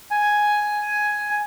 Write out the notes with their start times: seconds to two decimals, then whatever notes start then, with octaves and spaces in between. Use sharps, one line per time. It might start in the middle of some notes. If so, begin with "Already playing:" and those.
0.11 G#5